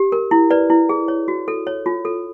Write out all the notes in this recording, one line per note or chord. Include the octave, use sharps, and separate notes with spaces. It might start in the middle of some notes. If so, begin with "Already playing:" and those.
Already playing: G4
A#4
E4
B4 D5
E4
G#4
C#5
F#4
A4
C#5
F4
A4